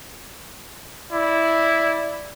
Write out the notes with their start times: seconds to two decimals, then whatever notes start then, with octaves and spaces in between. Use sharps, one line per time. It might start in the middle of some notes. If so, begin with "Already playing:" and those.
1.12 E4 D5